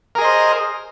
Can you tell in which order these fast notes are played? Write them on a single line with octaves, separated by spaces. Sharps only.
A#4 G#4 D#5 C5